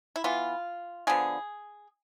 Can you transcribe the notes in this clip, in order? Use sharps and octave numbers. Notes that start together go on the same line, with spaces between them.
E4
E3 B3 F4
D3 F3 B3 G#4